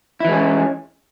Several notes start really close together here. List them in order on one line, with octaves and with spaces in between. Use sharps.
E4 E3 G#3 C#4